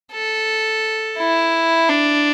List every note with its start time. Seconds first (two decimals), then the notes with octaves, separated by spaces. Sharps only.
0.13 A4
1.19 E4
1.89 D4